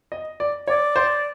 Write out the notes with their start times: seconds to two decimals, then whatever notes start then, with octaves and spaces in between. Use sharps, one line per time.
0.12 D#5
0.40 D5
0.67 C#5 D5
0.96 C5